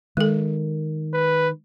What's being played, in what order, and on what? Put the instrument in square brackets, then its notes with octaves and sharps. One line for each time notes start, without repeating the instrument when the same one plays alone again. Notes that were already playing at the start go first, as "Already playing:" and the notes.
[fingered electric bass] D#3 [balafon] G#3 A4
[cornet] B4